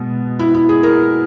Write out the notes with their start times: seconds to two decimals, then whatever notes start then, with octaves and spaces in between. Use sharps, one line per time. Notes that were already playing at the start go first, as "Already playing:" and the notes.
Already playing: B2 G#3 B3
0.39 E4
0.54 E4
0.69 G#4
0.83 A#4